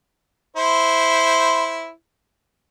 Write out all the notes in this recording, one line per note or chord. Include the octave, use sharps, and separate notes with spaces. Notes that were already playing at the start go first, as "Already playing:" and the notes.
E4 C5